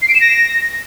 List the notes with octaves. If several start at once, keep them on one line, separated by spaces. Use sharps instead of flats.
C7
D7
E7
A#6